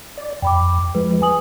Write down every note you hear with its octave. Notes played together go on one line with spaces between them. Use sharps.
D5
F2 G5 B5 D6
F3 G#3 B4
G#5 D#6 F#7